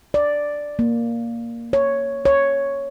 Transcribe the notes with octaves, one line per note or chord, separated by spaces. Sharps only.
D5
A#3
C#5
C#5